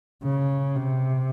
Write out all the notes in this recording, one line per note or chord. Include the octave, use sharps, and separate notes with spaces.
C#3
C3